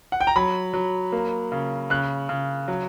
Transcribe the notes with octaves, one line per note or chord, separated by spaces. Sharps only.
F#5
G5
A#5
F#3 B5
F#3
A#3
C#3
C#3 F#6
C#3
F#3